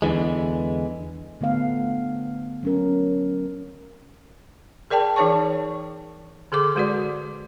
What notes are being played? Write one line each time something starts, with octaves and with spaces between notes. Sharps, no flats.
E2 D3 E3 G#3
D3 A3 B3 F5
F#3 C#4 A#4
G#4 A#4 D5 G5 A5
E3 D#4 G#4 C#5 A5 C#6
D3 G#4 A4 D6
D3 G#3 F#4 B4 D5